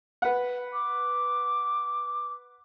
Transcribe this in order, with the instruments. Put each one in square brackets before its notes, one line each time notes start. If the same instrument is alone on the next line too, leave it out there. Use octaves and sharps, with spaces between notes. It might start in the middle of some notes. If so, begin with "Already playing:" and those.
[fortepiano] B4 F#5
[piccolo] D6